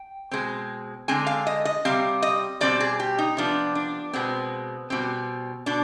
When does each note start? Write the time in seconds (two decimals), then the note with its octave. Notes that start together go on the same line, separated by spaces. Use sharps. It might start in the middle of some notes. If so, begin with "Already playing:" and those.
Already playing: G5
0.31 B2 G#3 C4
1.08 D3 G#3 C4 G#5
1.27 F5
1.47 D#5
1.65 D#5
1.85 C3 G3 C4 F5
2.22 D#5
2.61 B2 G3 C4 D5
2.80 G#4
3.00 G4
3.19 D#4
3.37 C3 F3 B3 D4
3.75 D4
4.13 B2 G#3 B3 C4
4.90 B2 G3 C4
5.66 B2 D4